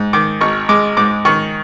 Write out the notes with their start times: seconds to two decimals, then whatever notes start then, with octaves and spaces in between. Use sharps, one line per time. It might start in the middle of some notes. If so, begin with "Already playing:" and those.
Already playing: G#2
0.13 D#3 D6
0.41 G#1 C#6
0.69 G#3 D6
0.97 G#2 D6
1.25 D#3 C#6